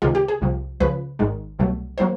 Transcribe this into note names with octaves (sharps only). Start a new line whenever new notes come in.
C#2 C3 D#3 G#3 F4
G4
G#4
C2 C3 F3
C#2 C#3 F3 B4
G#1 G#2 D#3 G#3
C2 B2 F#3 A3
D#3 F#3 A#3 C5